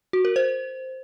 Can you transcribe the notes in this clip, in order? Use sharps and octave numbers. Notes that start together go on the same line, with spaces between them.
F#4
A#4
C5